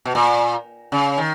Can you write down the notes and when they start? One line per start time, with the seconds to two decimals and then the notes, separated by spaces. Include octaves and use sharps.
0.05 B2
0.15 A#2
0.92 C#3
1.18 D#3